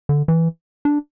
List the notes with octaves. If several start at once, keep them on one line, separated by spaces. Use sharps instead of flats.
D3
E3
D4